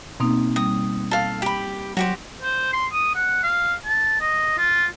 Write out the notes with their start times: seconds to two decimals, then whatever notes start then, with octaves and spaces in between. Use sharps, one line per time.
0.20 B2 A#3 C4 D#4
0.56 G3 D#6
1.11 A4 F5
1.42 G4 B5
1.97 F#3 F#4 G4 C5
2.42 C5
2.73 C6
2.92 D#6
3.15 F#5
3.43 F5
3.85 A5
4.21 D#5
4.58 F4